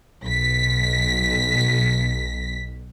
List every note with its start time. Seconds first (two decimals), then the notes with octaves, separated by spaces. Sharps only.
0.23 B1 B6